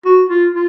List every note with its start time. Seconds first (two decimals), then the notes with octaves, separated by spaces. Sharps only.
0.05 F#4
0.29 F4
0.53 F4